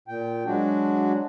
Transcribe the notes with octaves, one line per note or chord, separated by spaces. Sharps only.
A#2 G5
F#3 G#3 D4 F#4